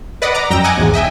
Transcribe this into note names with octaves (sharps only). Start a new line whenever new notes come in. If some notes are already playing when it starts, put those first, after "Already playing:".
B4 D5 D#5 F#5 D#6
A#5 D6
F#2 G5 A#5 E6
D#5 F#5 G#5 D6
B1 E2 G#2
D#5 E5 G5 G#5